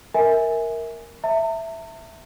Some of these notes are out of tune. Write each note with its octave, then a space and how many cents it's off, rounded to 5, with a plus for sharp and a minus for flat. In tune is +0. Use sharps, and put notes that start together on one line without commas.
A#4 +0 E5 -25 G#5 +0
E5 +0 A#5 -45